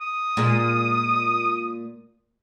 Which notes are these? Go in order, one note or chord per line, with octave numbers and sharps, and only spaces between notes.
D#6
A#2 G#3